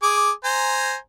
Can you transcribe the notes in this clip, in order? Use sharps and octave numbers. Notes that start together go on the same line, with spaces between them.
G#4 D6
C5 G#5 A#5